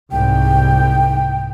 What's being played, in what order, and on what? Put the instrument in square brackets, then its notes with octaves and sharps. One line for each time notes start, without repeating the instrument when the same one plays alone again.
[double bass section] C2 G#2 [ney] G5